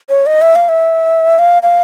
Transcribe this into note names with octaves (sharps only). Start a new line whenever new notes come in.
C#5
D#5
E5
F5
E5
F5
F5